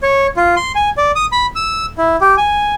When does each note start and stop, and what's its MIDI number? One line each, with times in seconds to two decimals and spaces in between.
0.03 0.27 73
0.37 0.55 65
0.56 0.72 84
0.75 0.90 80
0.98 1.11 74
1.16 1.26 87
1.32 1.46 83
1.56 1.86 88
1.98 2.16 64
2.21 2.35 67
2.37 2.75 80